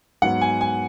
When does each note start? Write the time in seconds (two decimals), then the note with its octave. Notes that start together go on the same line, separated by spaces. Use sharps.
0.22 G#2 F#3 B3 F#5
0.41 G#5
0.61 G#5